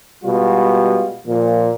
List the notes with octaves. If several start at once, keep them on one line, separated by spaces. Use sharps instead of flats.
B2 G3 G#3 F4
A#2 F3